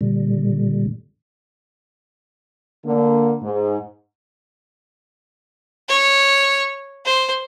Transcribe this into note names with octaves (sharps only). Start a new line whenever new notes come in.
A#2 D3 G3
D3 A#3
G#2
C#5
C5